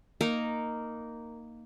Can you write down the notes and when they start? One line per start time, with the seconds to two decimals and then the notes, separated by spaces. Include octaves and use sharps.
0.21 A#3 D#4 A#4